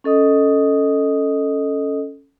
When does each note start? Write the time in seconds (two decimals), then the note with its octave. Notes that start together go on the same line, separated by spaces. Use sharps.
0.04 C#4 A4 D#5 D#6